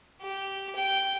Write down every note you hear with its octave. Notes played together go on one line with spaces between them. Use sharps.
G4
G5